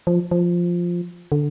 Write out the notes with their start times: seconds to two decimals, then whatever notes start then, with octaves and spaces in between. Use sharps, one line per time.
0.07 F3
0.31 F3
1.32 D3